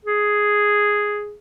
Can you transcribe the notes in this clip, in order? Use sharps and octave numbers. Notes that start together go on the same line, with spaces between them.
G#4